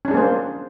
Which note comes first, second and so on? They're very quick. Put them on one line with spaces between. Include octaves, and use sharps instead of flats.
C#4 D4 G#4 A#3 C5